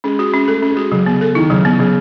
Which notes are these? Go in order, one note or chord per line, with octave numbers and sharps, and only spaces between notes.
G#3 C#4
F#4
C#4
A3 A4
C#4
G#3
F#4
C#3 F#3
B3
A4
D#3 E4
C#3 F#3
B3
C#3 F#3